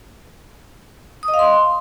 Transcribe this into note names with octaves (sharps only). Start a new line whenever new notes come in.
D#6
D#5
F5
C6